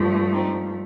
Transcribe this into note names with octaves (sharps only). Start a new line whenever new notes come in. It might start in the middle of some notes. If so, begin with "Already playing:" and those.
Already playing: G2 F3 A3
C4 D#4